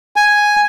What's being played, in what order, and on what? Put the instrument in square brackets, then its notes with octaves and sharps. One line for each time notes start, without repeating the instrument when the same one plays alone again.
[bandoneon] G#5